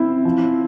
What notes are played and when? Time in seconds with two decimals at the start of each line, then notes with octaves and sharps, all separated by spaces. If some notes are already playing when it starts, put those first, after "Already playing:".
Already playing: C4 E4
0.25 F3